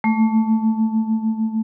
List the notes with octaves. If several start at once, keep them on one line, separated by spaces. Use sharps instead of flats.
A3